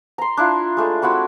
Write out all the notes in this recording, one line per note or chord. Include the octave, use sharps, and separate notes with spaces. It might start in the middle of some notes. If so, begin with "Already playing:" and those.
A#5 C6
D4 E4 F4
G#3 A3 D5
C4 E4 F#4 B5